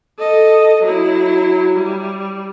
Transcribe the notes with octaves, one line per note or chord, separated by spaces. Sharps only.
A4 D#5
F#3 E4
G3